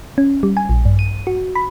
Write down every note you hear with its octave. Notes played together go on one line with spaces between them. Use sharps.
C#4
G3
G#5
A#1
G2
D#7
F#4
B5